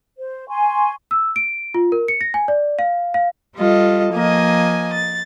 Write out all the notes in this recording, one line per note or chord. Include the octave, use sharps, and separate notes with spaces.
C5
G#5 C6 C#6
E6
D7
F4
A#4
C#7
A#6
G#5
D5
F5
F5
G3 F4 A4 D#5
F3 A#3 D#5 G#5
A6